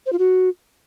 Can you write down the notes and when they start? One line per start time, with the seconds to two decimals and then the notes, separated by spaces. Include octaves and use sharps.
0.06 C5
0.12 F4
0.19 F#4